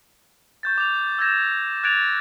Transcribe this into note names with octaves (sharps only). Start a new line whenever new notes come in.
C#6 G6 A6
D6 F7
E6 G6 G#6 A#6 E7
F#6 G#6 A6 D7 F7